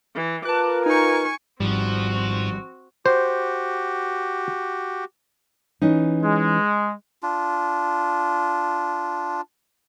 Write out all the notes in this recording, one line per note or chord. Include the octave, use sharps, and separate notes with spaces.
E3
F4 A#4 B4 A5 D6 F#6
D#4 G#5 C#6
G#1 G#2 F3 G3 C4 F#4
F#4 G4 C5
E3 C#4 D#4
G#3
D4 F4